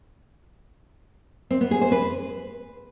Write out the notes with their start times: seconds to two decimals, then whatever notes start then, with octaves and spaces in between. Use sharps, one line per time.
1.51 C4
1.61 B3
1.71 G#4
1.81 C5
1.92 B4